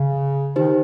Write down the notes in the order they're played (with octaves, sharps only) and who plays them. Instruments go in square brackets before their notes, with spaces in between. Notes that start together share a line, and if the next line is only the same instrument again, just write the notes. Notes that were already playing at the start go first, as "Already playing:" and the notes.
Already playing: [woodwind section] C#3
[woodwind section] D#3 [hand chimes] D#4 G4 C5